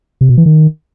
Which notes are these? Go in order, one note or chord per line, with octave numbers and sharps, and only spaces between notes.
C3
B2
E3
D#3